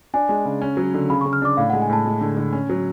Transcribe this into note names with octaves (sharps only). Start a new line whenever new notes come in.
D4 G#5
G#3
C#3
C#4
F#3
D3
C#3 B5
C#6
C#3
F6
D4 D6
A2 F5
F#5
G#3
G#5
A2 A5
G#3
D3
D3
C#4
F#3